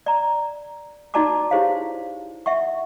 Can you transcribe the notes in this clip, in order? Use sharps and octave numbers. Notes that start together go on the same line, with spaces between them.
D5 A#5
D#4 F#4 D5 A5 A#5 D6
E4 G4 G#4 C5 C#5 F5
E5 F#5 C#6